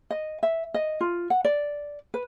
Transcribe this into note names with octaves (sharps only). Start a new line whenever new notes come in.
D#5
E5
D#5
F4
F#5
D5
B4